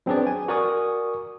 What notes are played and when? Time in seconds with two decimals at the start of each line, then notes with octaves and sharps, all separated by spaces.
0.06 F#3 C4 D4 G#4 B4 D5
0.27 G#5
0.48 F#4 A#4 D5 G#5 C#6 D#6